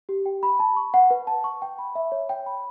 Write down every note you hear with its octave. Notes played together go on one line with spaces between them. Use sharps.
G4
G5
B5
A5
C#6
F#5
B4
A5
C#6
G5
B5
E5
C#5
G5
B5